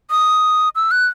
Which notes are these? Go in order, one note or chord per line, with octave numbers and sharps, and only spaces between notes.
D#6
E6
F#6